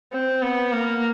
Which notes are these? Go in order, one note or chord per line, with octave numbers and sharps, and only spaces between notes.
C4
B3
A#3